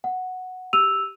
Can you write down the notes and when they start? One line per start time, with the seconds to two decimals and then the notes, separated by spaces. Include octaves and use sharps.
0.04 F#5
0.73 G4 E6 D#7 F7